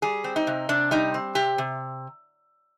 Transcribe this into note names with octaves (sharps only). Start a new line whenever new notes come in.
G3 G#4
C4
D#4
C3
C3 D4
G3 D#4
C4
C3 G4
C3